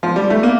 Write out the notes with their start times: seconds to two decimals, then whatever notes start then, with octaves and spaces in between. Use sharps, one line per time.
0.03 F3
0.16 G3
0.30 A3
0.43 A#3